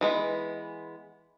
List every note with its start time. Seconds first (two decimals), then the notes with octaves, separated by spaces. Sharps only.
0.01 E3 G#3 B3